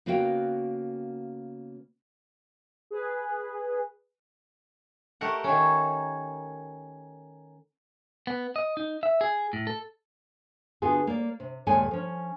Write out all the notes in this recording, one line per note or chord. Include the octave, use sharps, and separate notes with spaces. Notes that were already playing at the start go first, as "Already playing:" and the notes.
C#3 A#3 B3 F#4 F5 G5
G#4 B4
A3 G4 A#4 F#5
D#3 C#4
B3
D#5
D#4
E5
G#4
A2
A4
D3 B3 F4 F#4 G#4
A#3 D5
C3
D#2 A#2 G#3 A4 G#5
F3 C#4